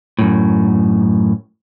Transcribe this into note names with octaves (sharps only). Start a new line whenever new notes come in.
F#2 A2